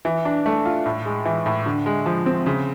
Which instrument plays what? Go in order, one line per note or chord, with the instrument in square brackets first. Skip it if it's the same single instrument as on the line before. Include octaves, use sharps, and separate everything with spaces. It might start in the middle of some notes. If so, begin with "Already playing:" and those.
[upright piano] E3
D4
A3
F4
A2
G#3
E3
A2
D3
G#3
F3
C4
C#3